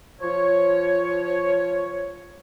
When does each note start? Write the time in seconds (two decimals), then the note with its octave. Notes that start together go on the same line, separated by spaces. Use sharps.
0.21 F3 C#5